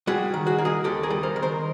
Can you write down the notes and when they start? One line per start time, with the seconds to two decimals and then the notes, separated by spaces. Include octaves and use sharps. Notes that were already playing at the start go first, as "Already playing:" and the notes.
0.07 G3 F#4 G#4
0.34 D#3
0.47 F#4 G#4
0.58 A#3
0.65 G#4 A#4
0.84 D#2 G4 A4
1.03 G#4 A#4
1.10 G3
1.23 A#4 C5
1.36 D#3
1.42 A#4 C5